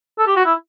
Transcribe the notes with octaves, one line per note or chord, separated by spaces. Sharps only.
A4
G4
F#4
E4